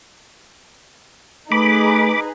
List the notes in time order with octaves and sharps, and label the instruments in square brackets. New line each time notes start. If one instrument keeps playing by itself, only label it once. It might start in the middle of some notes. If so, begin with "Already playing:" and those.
[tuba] A3 [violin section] D#4 G#4 B4 [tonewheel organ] B5 D6